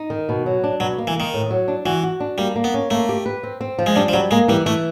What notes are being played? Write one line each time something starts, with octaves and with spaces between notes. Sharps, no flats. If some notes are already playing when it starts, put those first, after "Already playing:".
Already playing: D#4
D#3
B2
F#3
D4
B2 F#3
A#3
E3
D#3 A#3
A2
F#3
D4
E3 F#4
F#4
D4
G3 A#3
A#3
B3
C#4
A3 A#3
G4
B4
C4
C4
F3
G#3
G3 D4
F3
F#3 G3
G#3 A#3
E3 G3
E3 A3